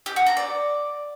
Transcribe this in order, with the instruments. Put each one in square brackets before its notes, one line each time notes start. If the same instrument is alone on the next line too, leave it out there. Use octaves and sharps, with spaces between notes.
[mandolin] G4
F#4
A#5
D5